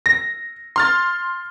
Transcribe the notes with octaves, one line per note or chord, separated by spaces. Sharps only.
A#6
C6 F6 A6